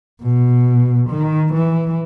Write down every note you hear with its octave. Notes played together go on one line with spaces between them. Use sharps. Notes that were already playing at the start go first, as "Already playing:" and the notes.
B2
D#3
E3